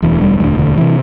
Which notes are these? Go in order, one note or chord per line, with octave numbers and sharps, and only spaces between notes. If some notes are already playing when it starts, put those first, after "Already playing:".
E1 D2 D3 E3
G3
E1 D2 D3 G3
D3
C3 E3